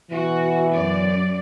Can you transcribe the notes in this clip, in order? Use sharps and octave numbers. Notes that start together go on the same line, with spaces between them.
B2 E3 F#4
F#2 D5